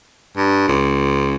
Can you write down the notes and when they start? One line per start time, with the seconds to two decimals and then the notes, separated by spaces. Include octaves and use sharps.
0.37 G2
0.68 C#2